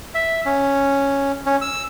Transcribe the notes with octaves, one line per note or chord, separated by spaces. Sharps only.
E5
C#4
C#4
E6